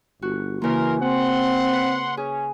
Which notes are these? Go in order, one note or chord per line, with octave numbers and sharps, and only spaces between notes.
G1 F#4
C#3 E3 A#3 A#4 C6
C4 F#5 C6
B4
C#4 G#4